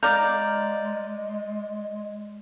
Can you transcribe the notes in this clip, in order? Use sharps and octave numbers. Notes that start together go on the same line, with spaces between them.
G#3 D#4 D5 F5 A#5 G6